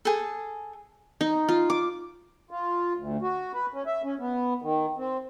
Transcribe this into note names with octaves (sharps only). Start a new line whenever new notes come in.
G#4 A4
D#4
F4
D6
F4
D2
F#4
B4
C#4
E5
C#4
B3
D#3
C4